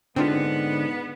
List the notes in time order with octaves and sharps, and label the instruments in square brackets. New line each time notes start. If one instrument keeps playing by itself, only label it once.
[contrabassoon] G#2 [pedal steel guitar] D3 [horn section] B3 [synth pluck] C4 D4 F4